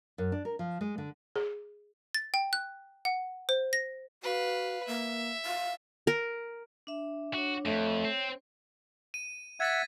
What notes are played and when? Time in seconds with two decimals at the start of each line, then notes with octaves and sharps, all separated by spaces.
0.18 F#2
0.32 D4
0.45 A#4
0.59 F3
0.81 G#3
0.98 D3
1.36 G#4
2.15 A6
2.34 G5
2.53 F#6
3.05 F#5
3.49 C5
3.73 A#6
4.23 F#4 B4 F5
4.87 A#3 E5
5.46 F5
6.07 A#4
6.87 D4 E5
7.34 D4 F#4 C#5
7.65 F2 A3 C#5
8.05 C4
9.14 D#7
9.60 E5 F#5 G#6 A6 B6